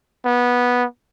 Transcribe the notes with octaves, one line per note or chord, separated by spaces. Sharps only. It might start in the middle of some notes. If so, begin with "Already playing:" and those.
B3